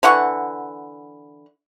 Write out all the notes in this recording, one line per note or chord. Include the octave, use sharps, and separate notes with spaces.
D3 E3 F#5 C#6